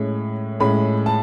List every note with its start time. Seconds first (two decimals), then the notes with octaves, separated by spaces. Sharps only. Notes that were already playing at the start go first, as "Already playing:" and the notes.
Already playing: A2 G#3 C#4 C#5
0.60 A2 G#3 C#4 B5
1.06 A5